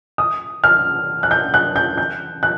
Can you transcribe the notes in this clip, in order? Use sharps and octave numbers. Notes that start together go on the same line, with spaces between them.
D#6
F6
F#6
G6
F#6
G6
G6
F#6